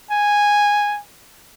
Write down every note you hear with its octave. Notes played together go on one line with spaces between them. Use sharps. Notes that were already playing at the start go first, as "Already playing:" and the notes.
G#5